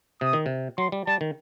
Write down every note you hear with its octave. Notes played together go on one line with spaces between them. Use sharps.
C3 D#6
D#3
C3
F#3 C6
G3
G3 A5
D#3